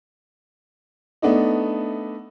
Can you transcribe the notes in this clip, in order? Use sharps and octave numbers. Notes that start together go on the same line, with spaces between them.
A3 B3 D4 D#4